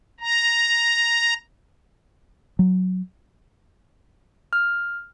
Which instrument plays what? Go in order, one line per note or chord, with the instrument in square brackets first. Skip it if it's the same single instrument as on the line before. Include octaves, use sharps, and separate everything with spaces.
[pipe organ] A#5
[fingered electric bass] F#3
[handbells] F6